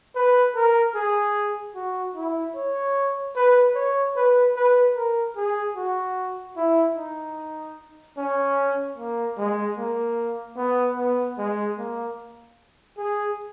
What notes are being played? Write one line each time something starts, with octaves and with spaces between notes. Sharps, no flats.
B4
A#4
G#4
F#4
E4
C#5
B4
C#5
B4
B4
A#4
G#4
F#4
E4
D#4
C#4
A#3
G#3
A#3
B3
B3
G#3
A#3
G#4